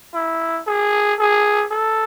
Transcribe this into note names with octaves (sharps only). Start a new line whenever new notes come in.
E4
G#4
G#4
A4